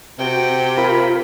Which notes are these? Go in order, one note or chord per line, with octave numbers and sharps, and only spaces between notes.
C3 F#4 G5
F4 A#4 B5